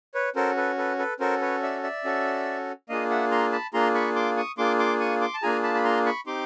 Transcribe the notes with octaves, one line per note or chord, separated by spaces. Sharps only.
B4 C#5
C#4 F#4 A4 A#4 C5
A4 B4
A4 B4
A4 B4
C#4 F#4 A4 A#4 C5
B4 C#5
D5 E5
D5 E5
C#4 F#4 A4
A#3 D4 F4 G#4 D#5 F5
E5 F#5
A#5 C6
A5 B5
A#3 D4 F4 G#4 A#5 C6
B5 C#6
C6 D6
C#6 D#6
A#3 D4 F4 G#4 C6 D6
C6 D6
C#6 D#6
C6 D6
A5
A#3 D4 F4 G#4 G#5 A#5
A5 B5
B5
A#5 C6
B5 C#6
C4 D#4 G4 C6 D6